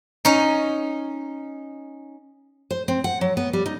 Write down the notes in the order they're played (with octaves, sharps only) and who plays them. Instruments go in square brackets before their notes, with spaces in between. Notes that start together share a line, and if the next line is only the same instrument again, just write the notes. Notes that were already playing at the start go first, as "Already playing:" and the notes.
[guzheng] C#4 D#4
[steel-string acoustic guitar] C5
C4
F#5
F#3
B3
G3
D#4